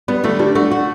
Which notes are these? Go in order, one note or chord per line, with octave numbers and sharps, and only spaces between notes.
G3 B3
D3 A3
G3 D4
A3 F#4
F#4